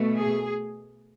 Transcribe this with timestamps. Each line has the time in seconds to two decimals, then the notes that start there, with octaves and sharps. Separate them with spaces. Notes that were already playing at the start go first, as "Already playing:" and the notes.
Already playing: B2 A3
0.15 G#4